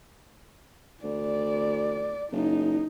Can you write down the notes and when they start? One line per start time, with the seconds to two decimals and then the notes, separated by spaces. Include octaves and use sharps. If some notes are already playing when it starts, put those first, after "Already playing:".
1.04 D2 D5
2.32 F#1 D#4